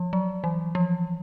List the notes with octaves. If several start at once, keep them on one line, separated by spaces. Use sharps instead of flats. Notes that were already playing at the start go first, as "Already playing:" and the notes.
Already playing: F3
F#3
E3
F3